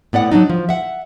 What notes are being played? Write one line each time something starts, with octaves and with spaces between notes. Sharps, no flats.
A2 B3 D5 F#5
F#3 G#3 D4 D#4
F3
E5 F#5